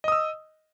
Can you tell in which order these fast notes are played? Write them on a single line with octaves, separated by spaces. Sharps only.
D#5 D#6 E6